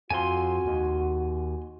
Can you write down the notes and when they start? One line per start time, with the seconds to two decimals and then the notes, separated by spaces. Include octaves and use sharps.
0.10 F2 F#4 G#5 C6
0.65 D#2